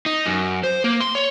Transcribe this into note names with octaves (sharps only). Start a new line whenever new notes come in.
D#4
F#2
C5
A#3
C6
C#5